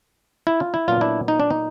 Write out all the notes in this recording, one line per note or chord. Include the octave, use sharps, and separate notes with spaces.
E4
F4
E4
A#2 F#3 B3 D4 F4
D4 E4
D#4
D4
D#4